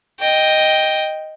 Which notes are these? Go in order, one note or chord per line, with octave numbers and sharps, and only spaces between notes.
D#5 G5